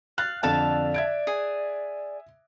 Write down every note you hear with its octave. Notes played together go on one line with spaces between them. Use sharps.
F5 F#6 A6
F2 D3 A4 D5 F5 A5
E5 G#6 D7
G#4